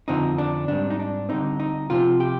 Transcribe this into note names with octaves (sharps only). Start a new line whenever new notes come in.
F2 D3 F3 C4 D#4
D4
G#2 G3 C4 D4
D#4
D4
D3 G3 C4 D#4
D#4
C3 F3 C4 F4
G4